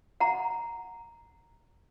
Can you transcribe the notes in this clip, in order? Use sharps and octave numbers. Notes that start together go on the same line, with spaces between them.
F#5 A#5